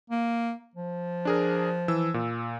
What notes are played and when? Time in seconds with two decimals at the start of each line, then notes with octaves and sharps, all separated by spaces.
0.10 A#3
0.76 F3
1.25 D4 G#4 A#4
1.88 E3 E6
2.14 A#2